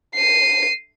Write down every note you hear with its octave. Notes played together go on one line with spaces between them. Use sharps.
C7 D#7